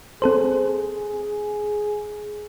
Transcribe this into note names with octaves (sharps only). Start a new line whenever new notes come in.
C4 G#4 A4 C5